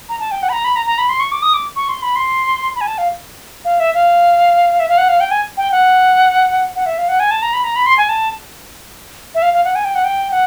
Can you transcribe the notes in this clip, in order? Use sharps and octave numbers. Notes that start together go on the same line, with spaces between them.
A#5
A5
G5
F#5
B5
A#5
B5
A#5
A#5
B5
C6
C#6
D6
D#6
D6
C#6
C6
B5
C6
B5
G#5
A5
F5
F5
E5
F5
E5
F5
F#5
F5
G5
G#5
G5
F#5
F#5
E5
F5
F#5
G#5
A5
A#5
B5
A#5
B5
C6
G#5
A5
E5
F5
F5
F#5
G#5
G5
F#5
G5
F#5